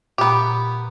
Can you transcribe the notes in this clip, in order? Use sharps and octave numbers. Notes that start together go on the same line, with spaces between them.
A#2 B3 G4 A#5